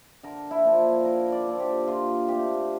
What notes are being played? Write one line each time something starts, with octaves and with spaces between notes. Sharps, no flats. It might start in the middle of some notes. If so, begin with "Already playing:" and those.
D3 A#4
E4
F3 A#3 D4
D3 A#4
D5
F3 A#3 D4
G4
A#2 F4
A3 C4 G4